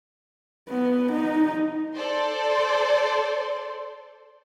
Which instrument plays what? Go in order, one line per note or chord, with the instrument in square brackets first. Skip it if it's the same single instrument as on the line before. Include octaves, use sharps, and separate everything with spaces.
[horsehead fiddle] B3
D#4
[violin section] A4 C5 D5 C6